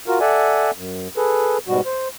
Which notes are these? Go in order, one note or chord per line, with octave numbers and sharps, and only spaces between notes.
F4 F#4 A#4
A4 D5 E5 F#5 G#5
F#2
G#4 A4 B4
G#2 B2 G3 F#4
C5